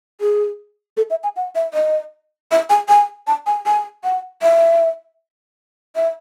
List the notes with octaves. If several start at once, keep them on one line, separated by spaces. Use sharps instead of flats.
G#4
A4
E5
G#5
F#5
E5
D#5
E5
G#5
G#5
A5
G#5
G#5
F#5
E5
E5